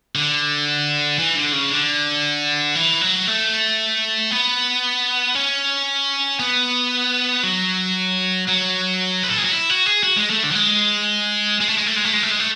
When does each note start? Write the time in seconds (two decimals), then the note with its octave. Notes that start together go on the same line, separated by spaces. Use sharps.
0.15 D3
1.19 E3
1.36 D3
1.53 C#3
1.71 D3
2.75 E3
3.01 F#3
3.28 A3
4.31 B3
5.35 C#4
6.40 B3
7.43 F#3
8.47 F#3
9.23 B4
9.30 A4
9.38 G#4
9.45 F#4
9.51 E4
9.70 F#4
9.86 G#4
10.03 F#4
10.16 G#3
10.30 A3
10.43 D3
10.51 F#3
10.55 G#3
11.61 G#3
11.69 A3
11.78 G#3
11.86 A3
11.96 G#3
12.04 A3
12.13 G#3
12.23 A3
12.31 G#3
12.40 A3